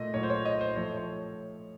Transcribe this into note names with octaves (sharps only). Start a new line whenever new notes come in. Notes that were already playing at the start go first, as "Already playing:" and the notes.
Already playing: A#2 A3 D#5
A#2 F#3 A3 C#5
C5
C#5
D#5
C5
A2 F3 A3 C#5
C#5